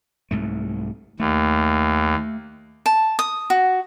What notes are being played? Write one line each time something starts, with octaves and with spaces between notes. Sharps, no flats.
C2 G#2 A3
D#2 A3
A5
D#6
F#4